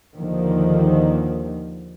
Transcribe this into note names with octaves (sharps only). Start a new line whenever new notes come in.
D#2 D3 D#3 F3